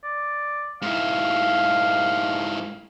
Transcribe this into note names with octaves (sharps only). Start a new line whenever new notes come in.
D5
G#2 E4 F5